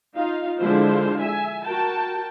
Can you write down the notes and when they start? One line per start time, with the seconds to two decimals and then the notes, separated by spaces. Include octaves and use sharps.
0.17 D#4 F4 F5
0.60 D3 F3 G#3 E4 F4 C5
1.19 E5 G#5
1.65 F#4 A#4 G5 A5